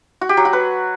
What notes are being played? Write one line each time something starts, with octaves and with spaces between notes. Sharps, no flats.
F#4
G4
F#3
F#4
B4